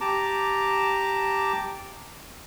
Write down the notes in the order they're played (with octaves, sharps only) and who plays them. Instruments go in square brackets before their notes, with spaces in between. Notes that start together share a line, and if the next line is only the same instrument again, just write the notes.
[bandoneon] G4 A5 A#5 D6